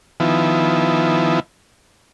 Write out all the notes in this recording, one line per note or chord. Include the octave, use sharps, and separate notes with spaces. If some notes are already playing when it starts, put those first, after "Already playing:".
D#3 F3 B3 E4